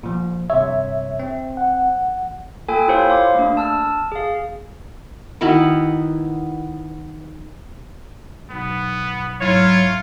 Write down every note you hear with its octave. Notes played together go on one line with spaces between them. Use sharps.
A#2 F3
G2 C3 C#5 E5
C4
F#5
A#3 F4 A4 G5 G#5
E4 F4 G4 C5 C#5 F5
F5 D6
A3 A#3 D4
A5 E6 F6
G#4 F5
D#3 B3 E4 F#4
B1 B3
G#2 F#3 A3 E4 F4 C#5